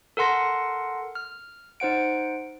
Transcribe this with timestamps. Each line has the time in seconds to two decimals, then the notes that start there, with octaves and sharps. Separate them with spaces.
0.17 A4 A#4 F#5 C6 A#6
1.15 F6
1.80 D#4 C5 F#5 D7